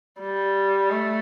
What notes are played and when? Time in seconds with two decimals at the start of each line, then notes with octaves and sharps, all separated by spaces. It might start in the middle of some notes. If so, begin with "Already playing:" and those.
0.20 G3
0.90 A3